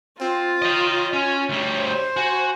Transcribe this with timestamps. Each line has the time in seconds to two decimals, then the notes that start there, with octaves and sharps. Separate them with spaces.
0.20 C4 F4
0.62 C#5 D#5 G5
1.13 C#4
1.49 D2 G3
1.79 C5
2.17 F#4 G#5